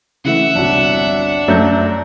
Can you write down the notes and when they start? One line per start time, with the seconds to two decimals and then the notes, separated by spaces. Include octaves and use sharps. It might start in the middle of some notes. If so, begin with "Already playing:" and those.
0.25 C#3 E3 A3 E5 F#5
0.55 G1 C2 D4 F#4
1.48 F#2 F#3 A3 E5 G6